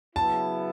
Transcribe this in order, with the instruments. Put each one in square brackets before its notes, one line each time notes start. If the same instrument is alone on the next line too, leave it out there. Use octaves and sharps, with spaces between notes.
[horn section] C#3 F#3 B3 E4 [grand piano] A5